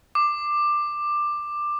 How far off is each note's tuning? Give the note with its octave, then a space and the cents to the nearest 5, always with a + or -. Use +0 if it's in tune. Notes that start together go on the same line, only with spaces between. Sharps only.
D6 +15